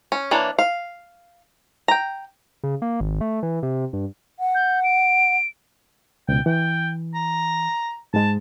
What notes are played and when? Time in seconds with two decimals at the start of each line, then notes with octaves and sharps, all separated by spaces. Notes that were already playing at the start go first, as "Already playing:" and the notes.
0.12 C#4
0.31 E3 A#3 D4 C#5
0.59 F5
1.88 G5 A#5
2.64 C#3
2.82 A#3
3.00 G#1
3.21 A3
3.43 E3
3.63 C3
3.93 G2
4.40 F#5
4.55 G6
4.84 D7
6.29 C#2 B2 G5
6.46 E3 G5
7.15 A#5
8.14 G#2 G#3 A5